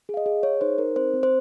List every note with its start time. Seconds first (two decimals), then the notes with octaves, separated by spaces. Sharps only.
0.09 G#4
0.14 F5
0.17 D#5
0.26 G#4
0.43 G#4 C#5
0.61 D#4 C5
0.78 D#4 A#4
0.96 C4 C5
1.14 C4
1.23 C5